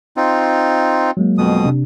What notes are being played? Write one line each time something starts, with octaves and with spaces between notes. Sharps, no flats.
C4 D#4 F4
F#3 G#3 A#3
F2 B2 D#6
C3 D4